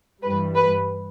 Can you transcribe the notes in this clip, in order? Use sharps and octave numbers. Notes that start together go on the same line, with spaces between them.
G2 E3 G3 B4
B4